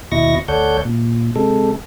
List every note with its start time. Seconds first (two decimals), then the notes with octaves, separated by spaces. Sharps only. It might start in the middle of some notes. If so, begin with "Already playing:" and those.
0.12 D#2 B2 E4 D#5 C#6 A#6
0.48 D2 A4 C#5 D5 F#5 G6
0.85 A#2
1.36 C3 G#3 A4